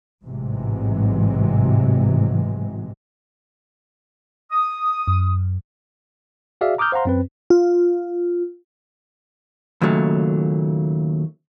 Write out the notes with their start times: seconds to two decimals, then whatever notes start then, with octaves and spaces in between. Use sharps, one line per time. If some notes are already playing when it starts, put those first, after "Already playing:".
0.24 A1 G#2 C3 E3 F#3 G#3
4.50 D#6
5.07 F#2
6.61 F#4 G#4 D5 E5 F5
6.78 A#5 D6 D#6 F6 G6
6.92 C5 F5 F#5 A#5 C6
7.05 F#2 C4 B4
7.50 F4
9.82 D#2 A#2 C#3 F#3 A3